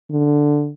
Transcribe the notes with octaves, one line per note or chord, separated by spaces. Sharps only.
D3